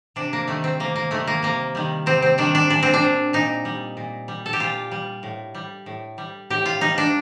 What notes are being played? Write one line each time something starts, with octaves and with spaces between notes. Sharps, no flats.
C3 D4
A#3
D#3 G3 A3
C4
C3 A#3
A#3
D#3 G3 A3
A#3
C3 A#3
D#3 G3
C3 C4
C4
D#3 G3 D4
D4
A#2 D4
C4
D4
G3
A#2 D#4
G3
A#2
G3
A4
G4
A#2 F4
G3
A2
G3
A2
G3
A2 G4
F4
G3 D#4
D4